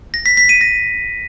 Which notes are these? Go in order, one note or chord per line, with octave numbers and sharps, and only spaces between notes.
A#6
B6
B6
D#7
A#6